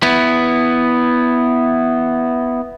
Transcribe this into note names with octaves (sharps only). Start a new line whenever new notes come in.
B3 E4